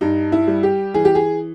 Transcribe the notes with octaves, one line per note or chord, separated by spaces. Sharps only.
G2 D#4
E4
G3
G4
E3 G#4
G4
G#4